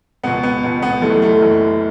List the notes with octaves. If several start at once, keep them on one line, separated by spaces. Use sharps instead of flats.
C#2 B2 B3
B3
C#2 B2
B3
F#1 F#2 E3 A3
A3
F#1 F#2 E3